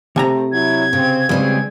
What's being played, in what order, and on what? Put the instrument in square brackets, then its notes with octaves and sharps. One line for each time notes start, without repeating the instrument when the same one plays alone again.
[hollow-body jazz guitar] C3 G#5 A#5 [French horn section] A3 C4
[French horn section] F#3 E4 [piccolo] G#6
[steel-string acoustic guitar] C#3 [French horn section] C4
[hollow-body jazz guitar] C#2 [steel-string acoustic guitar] G3 C4 C#4 [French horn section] G#4 B4